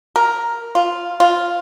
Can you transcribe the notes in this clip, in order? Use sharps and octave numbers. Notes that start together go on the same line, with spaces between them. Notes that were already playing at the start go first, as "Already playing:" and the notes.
A#4
F4
F4